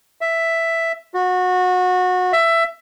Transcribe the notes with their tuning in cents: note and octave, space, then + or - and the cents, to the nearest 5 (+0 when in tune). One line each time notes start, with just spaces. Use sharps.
E5 +5
F#4 -25
E5 +15